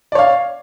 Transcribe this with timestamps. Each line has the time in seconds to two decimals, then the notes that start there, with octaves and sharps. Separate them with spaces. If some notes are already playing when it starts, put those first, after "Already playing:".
0.12 D5
0.15 C#5
0.19 F5